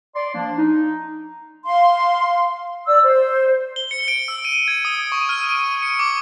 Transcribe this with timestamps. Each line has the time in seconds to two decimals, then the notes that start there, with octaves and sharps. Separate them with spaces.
0.15 D5 C6
0.35 F3 A#3 D4
0.58 D#4
1.64 F5 C6
2.86 D5 E6
3.04 C5
3.76 G7
3.91 C#7
4.08 D7
4.28 E6
4.45 D#7
4.68 G#6
4.85 D#6
5.12 C#6
5.29 F6
5.49 D7
5.83 C#7
5.99 D6